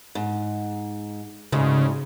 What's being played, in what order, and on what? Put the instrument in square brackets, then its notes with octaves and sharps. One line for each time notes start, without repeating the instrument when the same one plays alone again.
[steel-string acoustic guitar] G#2
[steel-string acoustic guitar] D2 G#2 [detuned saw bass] C#3